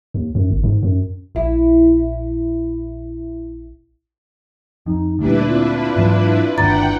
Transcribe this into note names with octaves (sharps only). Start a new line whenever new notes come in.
D#2
F#2
G1
G#2
F#2
A#1 E4
F2 D#4
D2 A#2 G3 D4 E4 B4
C4 F4
G#2 E3 F#3
G1 D#2 D4 F#5 G5 A#5 A6